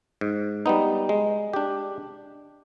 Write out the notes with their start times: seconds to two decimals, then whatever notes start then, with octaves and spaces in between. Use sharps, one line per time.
0.21 G#2
0.66 G3 B3 D#4
1.09 G#3
1.53 D4 G4